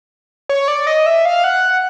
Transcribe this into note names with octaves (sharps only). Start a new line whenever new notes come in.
C#5
D5
D#5
E5
F5
F#5